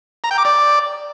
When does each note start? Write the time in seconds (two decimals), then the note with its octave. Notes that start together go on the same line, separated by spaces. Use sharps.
0.24 A#5
0.31 G5
0.38 D6
0.45 D5